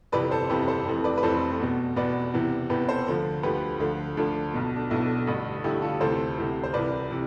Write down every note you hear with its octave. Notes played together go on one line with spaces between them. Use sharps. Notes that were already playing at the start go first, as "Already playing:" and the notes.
G1 F2 C3 E3 B4 D5
A4 C5
G1 F2 C3 E3 G4 B4
A4 C5
F1 F2 E3
B4 D5
B4
F1 F2 E3 A4 C5
E2 B2
E2 B2 B4 D5
E2 C3 E3
E2 C3 E3 G4 B4
A4 C5
D2 D3 F3
D2 D3 F3 G4 B4
D2 D3 F3
D2 D3 F3 D4
B1 B2
D4
B1 B2 E4
A1 G2 D3
A1 G2 D3 E4 G4
F4 A4
D2 C3 E3 A4 C5
D2 C3 E3
C5
C2 C3 E3 B4 D5
C3 E3